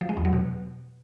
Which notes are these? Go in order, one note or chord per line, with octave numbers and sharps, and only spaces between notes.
F3
G#3
E2
F#3
B2